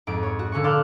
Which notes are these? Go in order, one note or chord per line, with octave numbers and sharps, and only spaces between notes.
F2 G#2 D7
C#5
F#4
A#2 D3 C#4 C#6
A4 D5 F5 C6 F#6